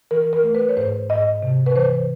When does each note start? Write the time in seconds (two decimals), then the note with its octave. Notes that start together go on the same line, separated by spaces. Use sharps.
0.11 E3 A#4
0.33 A#4
0.44 A3
0.55 B4
0.69 C#5
0.77 G#2 C5
1.10 G#2 D#5
1.43 C3
1.66 B4
1.76 E3 C5